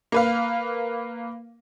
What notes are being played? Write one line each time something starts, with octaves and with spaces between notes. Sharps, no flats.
A#3 B4 F5